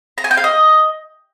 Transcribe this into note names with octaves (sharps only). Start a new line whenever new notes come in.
A#5
G#5
G5
F5
D#5